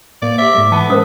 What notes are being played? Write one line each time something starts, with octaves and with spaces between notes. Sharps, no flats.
A2 A#3 D5
G4 C5 E5 D6
G#2 G#3 A3
E3 B3 A5
G#3 C#4 A#4 C5 D#6 E6